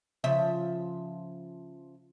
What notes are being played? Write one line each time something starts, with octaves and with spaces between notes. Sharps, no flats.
C#3 F3 E5